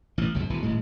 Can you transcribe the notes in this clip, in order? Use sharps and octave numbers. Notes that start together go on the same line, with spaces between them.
A1 E3
G1 C#2 B2 F#3
G#1 B2 E3
D#1 A2 G#3